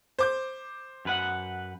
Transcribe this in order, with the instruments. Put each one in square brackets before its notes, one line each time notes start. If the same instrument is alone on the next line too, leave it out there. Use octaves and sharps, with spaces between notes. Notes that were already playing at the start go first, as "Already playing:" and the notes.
[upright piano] C5 D6 G6
[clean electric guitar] F#2 B4 F#5